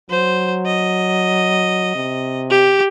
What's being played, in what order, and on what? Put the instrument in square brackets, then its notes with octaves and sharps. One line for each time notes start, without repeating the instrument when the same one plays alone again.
[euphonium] F#3 [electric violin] C5
[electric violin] D#5
[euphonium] C3
[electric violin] G4